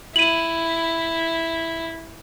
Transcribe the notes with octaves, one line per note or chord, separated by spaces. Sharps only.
E4 D#7 F#7